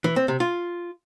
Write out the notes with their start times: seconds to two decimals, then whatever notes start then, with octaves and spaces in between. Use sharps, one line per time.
0.04 E3
0.16 C4
0.28 C3
0.40 F4